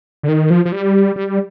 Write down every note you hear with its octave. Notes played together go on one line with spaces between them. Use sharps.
D3
D#3
F3
F3
G3
G3